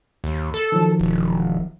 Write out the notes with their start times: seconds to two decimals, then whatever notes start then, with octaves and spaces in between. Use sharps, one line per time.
0.24 D#2
0.54 A4
0.72 D#3 F3 F#3
1.00 E1